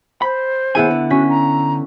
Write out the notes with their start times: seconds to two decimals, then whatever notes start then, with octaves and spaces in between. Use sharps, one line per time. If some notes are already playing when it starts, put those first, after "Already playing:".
0.22 C5 B5
0.75 D#2 B3 E4 G#4 G#5 D#7
0.91 D3
1.10 C#4 F#4 B6
1.29 A#5